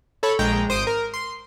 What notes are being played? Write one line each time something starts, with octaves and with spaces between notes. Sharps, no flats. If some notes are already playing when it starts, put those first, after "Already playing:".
A4 C#5 B5
A#1 G#3 G5 A#5
G#1 C5 D#6 D7
A#4
C6